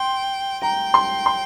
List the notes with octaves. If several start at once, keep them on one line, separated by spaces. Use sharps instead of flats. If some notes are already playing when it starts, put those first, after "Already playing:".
Already playing: G5 C6
G5 A#5
C6
C6